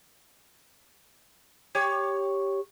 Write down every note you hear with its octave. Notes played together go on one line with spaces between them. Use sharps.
G4 C#5